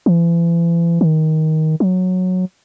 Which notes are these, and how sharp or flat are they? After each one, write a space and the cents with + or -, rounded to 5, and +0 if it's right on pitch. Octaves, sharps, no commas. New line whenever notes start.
E3 +40
D#3 +15
F#3 -10